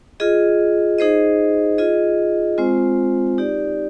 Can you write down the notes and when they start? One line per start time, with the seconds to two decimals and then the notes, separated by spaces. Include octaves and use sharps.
0.20 F4 G#4 D#5
0.99 D#4 G#4 C5 D#5
1.78 F4 G#4 D#5
2.58 G#3 C4 F4 C5
3.38 D#4 G4 D5